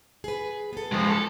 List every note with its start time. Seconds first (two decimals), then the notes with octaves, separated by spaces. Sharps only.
0.24 G#4 B4
0.73 B3 A4
0.92 F3 G#3
1.10 A4